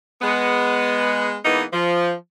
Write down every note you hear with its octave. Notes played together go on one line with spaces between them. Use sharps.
G#3 B3
E3 G#3 A#3 B3 D#4
F3